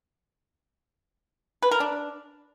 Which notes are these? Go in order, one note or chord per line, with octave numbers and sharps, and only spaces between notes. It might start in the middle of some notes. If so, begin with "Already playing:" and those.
B4
A#4
D4